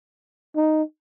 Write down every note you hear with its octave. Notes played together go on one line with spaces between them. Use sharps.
D#4